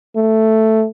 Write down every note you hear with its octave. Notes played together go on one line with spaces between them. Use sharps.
A3